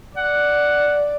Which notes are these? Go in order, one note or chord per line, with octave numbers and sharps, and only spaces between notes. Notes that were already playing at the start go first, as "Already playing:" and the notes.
D5 F#5